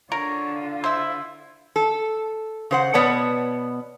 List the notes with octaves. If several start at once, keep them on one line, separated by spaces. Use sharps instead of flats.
D3 F4 A#4 C#5
E4 C5 E5
A4
C#3 C5 F#5
B2 B3 C#5 D5 A5